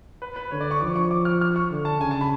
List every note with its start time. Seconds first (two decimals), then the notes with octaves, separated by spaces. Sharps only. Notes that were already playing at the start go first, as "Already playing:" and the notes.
0.22 B4
0.36 B4
0.51 D3 C#5
0.61 D5
0.71 C#6
0.81 F3 D6
0.96 C#6
1.11 D6
1.25 F6
1.41 F6
1.56 C#6
1.71 D3
1.85 A5
2.00 C#3 G#5
2.11 A5
2.21 B5